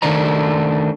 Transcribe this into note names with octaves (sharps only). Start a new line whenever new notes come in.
D#3 A3 D4 C5 D5 A#5